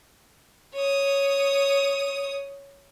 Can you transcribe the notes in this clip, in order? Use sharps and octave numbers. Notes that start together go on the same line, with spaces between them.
C#5 D#6